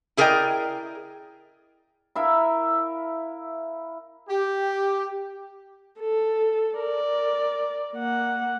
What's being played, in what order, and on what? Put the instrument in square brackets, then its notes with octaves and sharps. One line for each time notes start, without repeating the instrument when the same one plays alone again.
[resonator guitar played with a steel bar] E4 G#4 A#4 D5 D#5 G5
[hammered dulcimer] E4 A#4 E5 F5
[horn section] G4
[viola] A4
A#4 D5
A#3 F#5